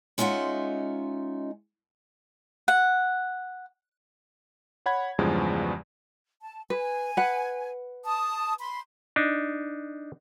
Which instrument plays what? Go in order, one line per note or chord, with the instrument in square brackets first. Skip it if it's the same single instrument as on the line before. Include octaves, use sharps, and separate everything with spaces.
[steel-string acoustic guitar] G#3 C#4 D#4 F4 E5 F#5
[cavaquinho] F#5
[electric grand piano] C#5 F#5 B5 G#6
E2 G2 C#3 F3 G#3
[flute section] A5
[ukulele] B4 [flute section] G#5
[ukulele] B4 F#5
[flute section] A5 D#6
B5 C6
[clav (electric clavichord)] D4 D#4